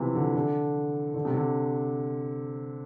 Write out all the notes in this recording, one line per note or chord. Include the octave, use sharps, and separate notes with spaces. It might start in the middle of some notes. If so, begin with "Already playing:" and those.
Already playing: C3 E3 F3
D3
D3
D3
C3
D3